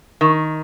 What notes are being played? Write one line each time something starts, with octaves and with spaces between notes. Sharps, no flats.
D#3